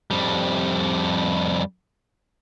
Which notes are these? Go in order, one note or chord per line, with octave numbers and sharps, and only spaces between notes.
F2 G3